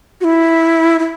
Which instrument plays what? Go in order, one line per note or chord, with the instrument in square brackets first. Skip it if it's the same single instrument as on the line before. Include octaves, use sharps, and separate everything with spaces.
[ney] F#4
E4
E4